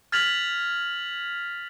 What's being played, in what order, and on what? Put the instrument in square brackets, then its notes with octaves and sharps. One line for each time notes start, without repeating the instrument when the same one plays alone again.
[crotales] F6 G#6 A6 B6 F7 F#7